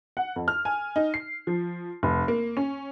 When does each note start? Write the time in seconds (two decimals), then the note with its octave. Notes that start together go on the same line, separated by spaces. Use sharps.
0.17 F#5
0.36 F2
0.48 F6
0.65 G#5
0.96 D#4
1.14 C7
1.47 F3
2.03 F1
2.28 A#3
2.57 C#4